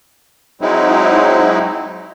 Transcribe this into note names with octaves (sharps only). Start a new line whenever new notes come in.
F#3 G#3 C4 D#4 E4